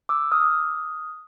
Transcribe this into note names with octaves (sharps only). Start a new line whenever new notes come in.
D6 E6
D#6 F6